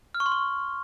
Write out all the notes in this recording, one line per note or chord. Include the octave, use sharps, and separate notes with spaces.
F6
C#6
C6
C#6